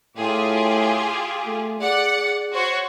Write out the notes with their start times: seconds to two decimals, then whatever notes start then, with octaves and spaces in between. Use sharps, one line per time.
0.17 A2 F4 G4 G#4
1.46 A3
1.81 G#4 D5 F#5
2.53 F#4 C5 C#5